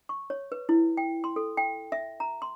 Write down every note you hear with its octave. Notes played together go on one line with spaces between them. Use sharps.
C#6
C#5
B4
E4
G5
C6
A4
G5
E5
A#5
C6